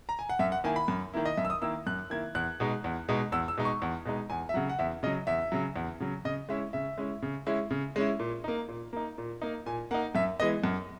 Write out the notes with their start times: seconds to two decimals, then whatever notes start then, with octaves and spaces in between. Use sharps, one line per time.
0.09 A#5
0.19 G#5
0.29 F#5
0.39 F#2 E5
0.52 F#5
0.64 D#3 A#3 E4 G#5
0.76 B5
0.88 F#2
1.14 D#3 A#3 E4
1.25 D#5
1.37 F#2 E5
1.45 E6
1.50 D#6
1.61 D#3 A#3 E4 E6
1.87 F#2 F#6
2.10 D#3 A#3 E4 G#6
2.35 E2 F#6
2.60 B2 G#3 D#4
2.84 E2
3.09 B2 G#3 D#4
3.32 E2 E6
3.48 E6
3.57 B2 G#3 D#4
3.65 C#6
3.82 E2
4.05 B2 G#3 D#4
4.30 E2 G#5
4.49 E5
4.54 C#3 F#3 F#5
4.69 F#5
4.79 E2 E5
5.03 C#3 D#5
5.06 F#3
5.27 E2 E5
5.52 C#3 F#3
5.76 E2
6.00 C#3 F#3
6.25 C#3 D#5
6.49 G#3 C#4 E4 E5
6.73 C#3 E5
6.98 G#3 C#4 E4
7.22 C#3
7.47 G#3 C#4 E4
7.71 C#3
7.96 G#3 C#4 E4
8.19 A#2
8.44 A#3 D#4
8.68 A#2
8.93 A#3 D#4
9.18 A#2
9.42 A#3 D#4
9.66 A#2 G#5
9.91 A#3 D#4 F#5
10.15 F#2 E5
10.40 E3 G#3 B3 D#5
10.64 F#2